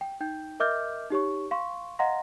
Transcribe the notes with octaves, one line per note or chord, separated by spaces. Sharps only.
G5
D#4 G5 G6
A#4 D#5 E5 D6 F6 G6
D#4 G4 C#5 C#6
F5 C6 C#6
D#5 F5 F#5 A#5 C6 A#6